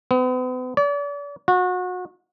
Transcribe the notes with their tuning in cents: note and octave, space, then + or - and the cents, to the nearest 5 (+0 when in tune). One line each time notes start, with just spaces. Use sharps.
B3 +40
D5 -40
F#4 -30